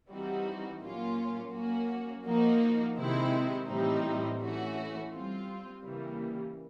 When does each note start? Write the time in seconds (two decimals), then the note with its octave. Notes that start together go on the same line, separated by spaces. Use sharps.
0.09 E3 G3 C4 D#4 F#4
0.81 A#2 F#3 A#3 C#4 F4
1.52 F#3 A#3 C#4 F#4
2.25 F3 A#3 D#4 F#4
2.96 C3 D#3 G#3 C4 E4
3.68 A2 E3 G3 C4 D#4
4.39 E3 A3 C#4 F#4
5.11 G3 C4 F4
5.82 C#3 E3 G3 A#3